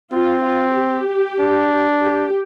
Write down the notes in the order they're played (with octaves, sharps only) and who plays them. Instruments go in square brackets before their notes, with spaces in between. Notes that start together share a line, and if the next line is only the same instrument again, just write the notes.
[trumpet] C4 [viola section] F4
[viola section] F4
G4
[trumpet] D4
[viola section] G4